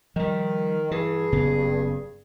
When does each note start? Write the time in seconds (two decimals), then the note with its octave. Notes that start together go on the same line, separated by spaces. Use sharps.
0.16 D#3 F3 G3
0.91 G2 E3 G#4
1.32 F#1 C#3 B3